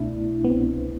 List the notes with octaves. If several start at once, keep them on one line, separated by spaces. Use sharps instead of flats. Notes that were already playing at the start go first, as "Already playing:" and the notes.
Already playing: C2 B2 A3 D4 E4
B2
B3
C2 C4